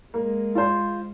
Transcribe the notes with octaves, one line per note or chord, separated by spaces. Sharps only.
G#3 A#3
F4 C5